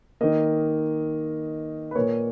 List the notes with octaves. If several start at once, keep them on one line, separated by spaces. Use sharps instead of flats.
D#3 A#3 D#5
B4
A#2 A#3 C#5